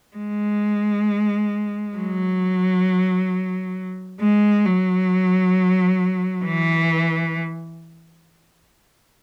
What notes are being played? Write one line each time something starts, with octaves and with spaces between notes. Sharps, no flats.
G#3
F#3
G#3
F#3
E3